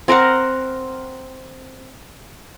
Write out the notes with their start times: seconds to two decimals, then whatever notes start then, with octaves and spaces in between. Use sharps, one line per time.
0.08 C4 A#4 C5 F#5